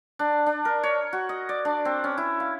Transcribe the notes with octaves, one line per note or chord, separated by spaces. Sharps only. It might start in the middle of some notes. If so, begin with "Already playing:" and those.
D4
D4
A#4
C#5
F#4
D#5
D5
D4
C4
C#4
E4
F5